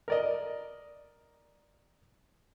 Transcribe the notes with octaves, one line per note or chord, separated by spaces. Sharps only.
A#4 D5 D#5